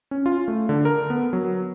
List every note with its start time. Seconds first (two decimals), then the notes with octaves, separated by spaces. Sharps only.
0.11 C#4
0.26 F4
0.48 A3
0.69 D3
0.85 A#4
1.10 B3
1.33 F#3